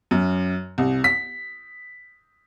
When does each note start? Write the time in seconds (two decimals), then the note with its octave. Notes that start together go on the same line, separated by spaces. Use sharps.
0.11 F#2
0.78 C2
1.04 B6